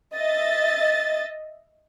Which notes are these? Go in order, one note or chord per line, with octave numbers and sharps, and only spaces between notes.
D#5 E5 A6